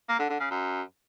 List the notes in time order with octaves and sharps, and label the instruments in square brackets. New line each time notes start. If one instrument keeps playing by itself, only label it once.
[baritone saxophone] A#3
D3
D3
C#3
F#2